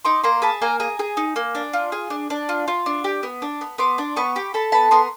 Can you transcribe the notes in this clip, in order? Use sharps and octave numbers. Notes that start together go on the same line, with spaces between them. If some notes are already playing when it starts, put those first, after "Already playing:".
D#4 C6 D6
A#3 A#5 C6
G#4 A5 B5
A#3 G#5 A#5
G#4 G#5 A#5
G#4
D#4
A#3
D4
F4
G#4
D4
D4
F4
F4
D4
G4
B3
D4
B3
B3 C6 D6
D4
B3 B5 C#6
G4
A4 A5 B5
B3 A5 B5
B3 A#5 C6